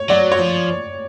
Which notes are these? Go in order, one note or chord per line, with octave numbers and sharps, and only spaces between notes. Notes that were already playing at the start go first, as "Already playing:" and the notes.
Already playing: C#5
F#3 D5
C#5
F3